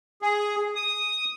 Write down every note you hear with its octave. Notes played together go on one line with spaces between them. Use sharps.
G#4
D#6